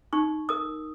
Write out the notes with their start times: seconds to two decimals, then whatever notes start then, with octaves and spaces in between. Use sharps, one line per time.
0.13 D#4 C#6
0.49 A#4 D#6